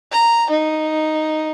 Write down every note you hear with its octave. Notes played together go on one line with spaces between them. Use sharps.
A#5
D#4